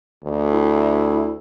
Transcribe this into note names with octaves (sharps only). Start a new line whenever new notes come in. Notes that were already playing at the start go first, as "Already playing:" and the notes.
D2
E4